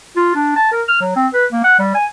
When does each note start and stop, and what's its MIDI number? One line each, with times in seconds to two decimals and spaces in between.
0.17 0.31 65
0.35 0.55 62
0.56 0.68 81
0.72 0.82 70
0.88 1.01 89
1.01 1.16 54
1.16 1.27 60
1.34 1.45 71
1.52 1.63 58
1.64 1.77 78
1.79 1.90 55
1.94 2.05 80